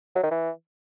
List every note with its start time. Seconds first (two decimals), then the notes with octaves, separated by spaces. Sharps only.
0.15 F#3
0.23 D#3
0.31 E3